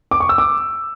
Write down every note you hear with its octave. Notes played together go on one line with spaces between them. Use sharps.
D6
C#6
E6
D6